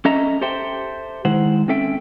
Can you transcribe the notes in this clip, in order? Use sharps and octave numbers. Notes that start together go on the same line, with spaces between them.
C#4 A4 D#5 E5 A#5
G4 A4 C5 E5 G5
D#3 G#3 E4 C5 F#5
C4 C#4 A4 E5 G5